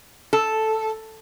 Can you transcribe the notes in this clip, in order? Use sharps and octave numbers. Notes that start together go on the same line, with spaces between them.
A4